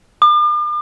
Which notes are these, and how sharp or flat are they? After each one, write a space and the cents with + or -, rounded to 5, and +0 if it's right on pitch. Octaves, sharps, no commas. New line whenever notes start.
D6 +45